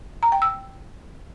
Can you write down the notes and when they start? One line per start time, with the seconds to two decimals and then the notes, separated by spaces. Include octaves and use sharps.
0.23 A#5
0.32 G5
0.42 E6